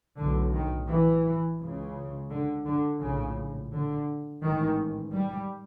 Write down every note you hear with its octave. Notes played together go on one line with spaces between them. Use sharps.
B1 A2 D3
D#3
E3
C#2 C#3
D3
D3
A#1 A2 C#3
D3
A1 G#2 D#3
G3